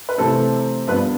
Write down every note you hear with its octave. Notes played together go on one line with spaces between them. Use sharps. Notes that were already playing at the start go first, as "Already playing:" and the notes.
B4
C3 E3 A3 C4 A4
G2 F3 B3 B4